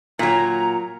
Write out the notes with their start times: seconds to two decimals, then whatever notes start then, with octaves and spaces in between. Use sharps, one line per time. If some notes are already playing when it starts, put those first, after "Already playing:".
0.19 A#2 F#3 A#5